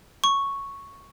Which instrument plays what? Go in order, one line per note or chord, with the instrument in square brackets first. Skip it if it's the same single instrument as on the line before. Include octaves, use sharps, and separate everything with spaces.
[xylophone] C#6